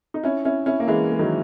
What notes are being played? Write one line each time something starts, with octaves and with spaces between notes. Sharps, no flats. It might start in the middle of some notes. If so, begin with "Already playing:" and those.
D#4
C#4 E4
C#4 E4
C#4 E4
A#3
E3 G#3
G#3
D#3 F#3